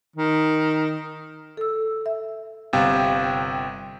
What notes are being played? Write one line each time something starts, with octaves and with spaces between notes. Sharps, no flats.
D#3
A4 E6
E5
G1 C3 F5 G5